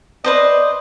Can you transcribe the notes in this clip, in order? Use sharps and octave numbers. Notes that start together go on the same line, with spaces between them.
B4 C5 D5 D#5